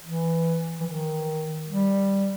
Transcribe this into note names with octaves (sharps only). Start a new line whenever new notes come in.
E3
E3
D#3
G3